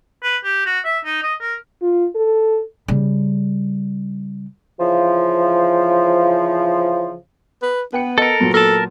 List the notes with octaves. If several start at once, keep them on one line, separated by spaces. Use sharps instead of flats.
B4
G4
F#4
E5
D#4
D#5
A#4
F4
A4
C#3 G3
C#3 E3 F3
B4
B3 B4 G5 C#7
A4 A#4 D#5 E6 C#7
A#2 F#3 B3
A4 A#4 A5